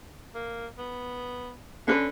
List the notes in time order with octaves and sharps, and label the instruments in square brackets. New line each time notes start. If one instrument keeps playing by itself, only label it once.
[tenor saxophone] A#3
B3
[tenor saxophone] D3 [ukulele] C#4 B4